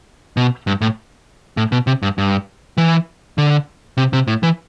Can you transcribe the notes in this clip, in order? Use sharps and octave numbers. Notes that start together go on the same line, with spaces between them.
B2
G2
A2
A2
B2
C3
G2
G2
E3
D3
C3
C3
A2
E3